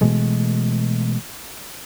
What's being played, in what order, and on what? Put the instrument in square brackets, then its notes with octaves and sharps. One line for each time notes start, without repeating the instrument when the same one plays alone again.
[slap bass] B2 E3 G#3 A3